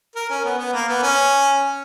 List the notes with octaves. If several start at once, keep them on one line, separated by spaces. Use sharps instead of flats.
A#4
C#4
B3
B3
A#3
B3
C#4